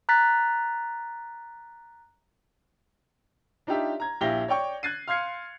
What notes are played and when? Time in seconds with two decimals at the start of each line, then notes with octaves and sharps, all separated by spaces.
0.09 A#5 F#6 A6 B6
3.67 D4 D#4 F4 G4 E5
4.00 A#5 G#6
4.21 A#1 E4 G4 F5 A#6 G7
4.48 C#5 D5 G5 C#6
4.83 F#6 G#6 A6 C7 D#7
5.07 F5 C6 F6 G#6 C7 C#7